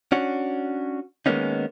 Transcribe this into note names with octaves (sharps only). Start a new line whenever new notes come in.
C#4 D4 F#4
D#3 G#3 A#3 B3 C#4 D#4